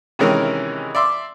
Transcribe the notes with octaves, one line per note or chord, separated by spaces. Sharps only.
C3 D#3 E3 G#3 C#4 A#4
D5 E5 C6 D6